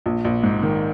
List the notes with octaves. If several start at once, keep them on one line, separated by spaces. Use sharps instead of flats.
A#1
A#1
G#2
D#3